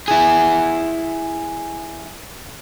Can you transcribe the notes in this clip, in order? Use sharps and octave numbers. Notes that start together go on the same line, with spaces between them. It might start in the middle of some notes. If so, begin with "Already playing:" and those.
E4 G#4